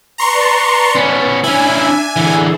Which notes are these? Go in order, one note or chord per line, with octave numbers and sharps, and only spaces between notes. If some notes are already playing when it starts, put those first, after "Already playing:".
B4 D5 A5 A#5 C6 C#6
B3 C#4
C#4 D4 E4 E5 G#5
D3 E3 G#4 A4